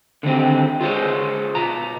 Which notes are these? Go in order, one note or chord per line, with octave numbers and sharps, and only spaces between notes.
D3 D#3 C4 G4
F4 G#4 C5 C#5
B2 A#5